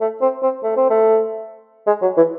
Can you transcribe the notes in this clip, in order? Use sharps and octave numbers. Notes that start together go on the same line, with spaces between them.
A3
C4
C4
A3
C4
A3
G#3
F#3
E3